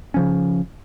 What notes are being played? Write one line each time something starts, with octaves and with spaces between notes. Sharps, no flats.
C#3 F3 C#4